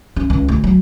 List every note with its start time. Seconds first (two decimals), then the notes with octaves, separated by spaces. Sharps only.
0.16 C#4
0.30 C#2
0.49 D2
0.64 F#3